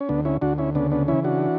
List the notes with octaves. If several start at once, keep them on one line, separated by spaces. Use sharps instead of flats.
C#4
D2 B3 D4
C#4 E4
D2 D4 F#4
C#4 E4
C#3 B3 D4
B3 D4
E3 C#4 E4
D4 F#4